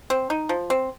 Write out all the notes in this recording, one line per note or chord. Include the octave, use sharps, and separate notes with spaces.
C4
D#4
F3
C4